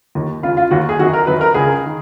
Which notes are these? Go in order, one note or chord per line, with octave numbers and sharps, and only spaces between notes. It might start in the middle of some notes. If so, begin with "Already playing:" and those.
D#2 D#3
C#2 C#3 F4
F4
D#2 D#3 F#4
G#4
F#2 D#3 F#4
A#4
F#2 D#3 B4
A#4
C#2 C#3 G#4
D#3